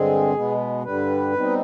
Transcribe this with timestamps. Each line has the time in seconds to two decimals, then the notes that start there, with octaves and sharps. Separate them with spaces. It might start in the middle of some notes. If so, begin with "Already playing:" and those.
Already playing: G2 D3 G#3 C4 G#4
0.34 B2 G#3 B3
0.84 G2 D3 G3 B4
1.34 B2 G3 C4 D#4